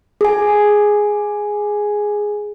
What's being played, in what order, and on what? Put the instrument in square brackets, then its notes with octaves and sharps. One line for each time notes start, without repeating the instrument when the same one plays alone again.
[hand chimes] G#4 G#5